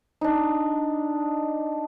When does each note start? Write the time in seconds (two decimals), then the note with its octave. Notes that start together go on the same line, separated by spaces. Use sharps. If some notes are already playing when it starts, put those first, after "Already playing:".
0.21 D4 D#4